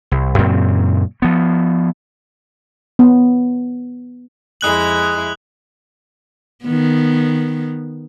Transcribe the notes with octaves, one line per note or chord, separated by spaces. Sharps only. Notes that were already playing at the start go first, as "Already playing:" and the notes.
C2
F#2 A#2 C#3 C4
F3 B3
B3
F2 G#3 E4 D#6 F#6 F#7
D#3 B3